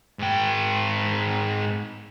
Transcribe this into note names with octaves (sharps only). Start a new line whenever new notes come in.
G#2 G5